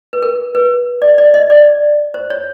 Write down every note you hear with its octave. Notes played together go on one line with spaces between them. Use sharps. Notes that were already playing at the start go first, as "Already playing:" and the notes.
B4
A#4
B4
D5
D5
D#5
D5
C5
C#5